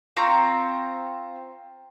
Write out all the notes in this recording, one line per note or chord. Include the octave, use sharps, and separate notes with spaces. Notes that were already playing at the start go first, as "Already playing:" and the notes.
C4 F4 A#5 C#6